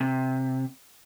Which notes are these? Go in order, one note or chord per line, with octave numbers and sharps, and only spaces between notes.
C3